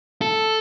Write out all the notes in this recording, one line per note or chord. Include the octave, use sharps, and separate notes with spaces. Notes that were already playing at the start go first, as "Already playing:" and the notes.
A4